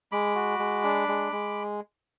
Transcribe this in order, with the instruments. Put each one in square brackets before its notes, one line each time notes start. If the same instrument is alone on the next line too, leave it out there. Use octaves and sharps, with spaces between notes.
[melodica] G#3 B5 D6
F#4
G#3
D4
G#3
G#3